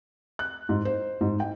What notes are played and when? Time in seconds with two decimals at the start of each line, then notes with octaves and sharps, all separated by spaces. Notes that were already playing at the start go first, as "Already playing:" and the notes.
0.39 F#6
0.69 G#2
0.85 C5
1.21 G#2
1.40 G5